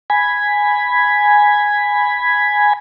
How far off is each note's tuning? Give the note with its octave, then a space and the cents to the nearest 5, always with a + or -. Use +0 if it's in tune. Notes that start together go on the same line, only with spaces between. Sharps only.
G#5 +0 B5 +0